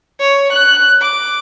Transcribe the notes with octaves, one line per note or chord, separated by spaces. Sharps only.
C#5
F#6
D6